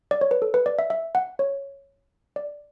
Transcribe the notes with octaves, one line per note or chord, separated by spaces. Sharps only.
D5
C#5
B4
A4
B4
D5
E5
E5
F#5
C#5
D5